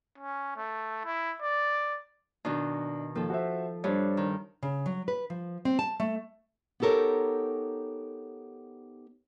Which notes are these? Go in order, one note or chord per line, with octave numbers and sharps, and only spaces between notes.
C#4
A3
E4
D5
B2 D#3 D4
D#2 F3 A4
F#4 C5 E5
G2 D4 C5 C#5
D#3
C#3
F#3
B4
F3
C4
A5
A3
B3 D#4 G4 A4 A#4 C#5